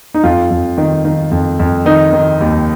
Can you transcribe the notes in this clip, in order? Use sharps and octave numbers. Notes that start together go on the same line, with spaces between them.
D#4
F2 F4
F2
D#3
D#3
F2
F2
D#3 D#4
D#3
D#2